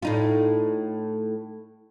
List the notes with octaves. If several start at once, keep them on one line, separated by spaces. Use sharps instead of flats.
A2 D#4 F4